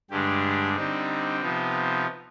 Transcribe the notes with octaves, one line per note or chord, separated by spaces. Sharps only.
G2 D3 G#3 D4 G4
D3 G3 C4 D#4
C3 F3 B3 D#4